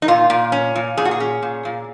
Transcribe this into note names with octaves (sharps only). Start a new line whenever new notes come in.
D#4
A#2 F4
A#2
C#4
A#2
A#2 G#4
F#4
G#4
C#4
A#2
A#2